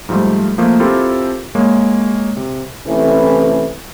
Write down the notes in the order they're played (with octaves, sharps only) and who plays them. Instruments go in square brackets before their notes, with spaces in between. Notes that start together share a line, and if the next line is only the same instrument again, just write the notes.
[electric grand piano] G#2 F3 G3 A3
F3 A3 A#3
C4 E4 F4 G4 A4 A#4
G#3 A#3 C#5
C3
[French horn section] C3 E3 A3 C#4 E4